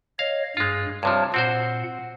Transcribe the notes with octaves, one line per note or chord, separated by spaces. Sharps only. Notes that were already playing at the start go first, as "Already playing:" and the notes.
C#5 D#5 F5
G2 G#3 F4
G2 C3 F3 C#5 A5
A#2 C4 F#4 C5 F#5